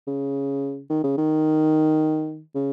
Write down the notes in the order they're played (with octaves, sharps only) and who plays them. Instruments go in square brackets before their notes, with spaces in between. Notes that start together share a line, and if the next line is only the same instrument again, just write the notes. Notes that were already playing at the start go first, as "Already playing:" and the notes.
[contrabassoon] C#3
D#3
C#3
D#3
C#3